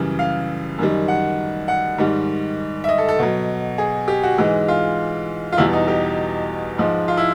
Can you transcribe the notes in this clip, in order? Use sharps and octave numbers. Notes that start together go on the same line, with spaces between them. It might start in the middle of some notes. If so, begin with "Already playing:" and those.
Already playing: F#2 C#3 E3 G3
F5
F#2 D#3 G3
F#5
F#5
G#2 D#3 G3
E5
D#5
A4
A4
B2 F#3
G#4
G4
F#4
G#2 E3 G#3
F4
F4
E2 B2 G3 E4
D#4
G4
G#2 F3 G#3
F4
E4